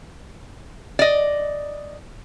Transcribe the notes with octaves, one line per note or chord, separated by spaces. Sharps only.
D5 D#5